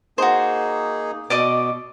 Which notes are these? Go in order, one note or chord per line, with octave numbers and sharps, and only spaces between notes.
A#3 D#4 F#4 G#4 C5
B2 D5 D#5 D6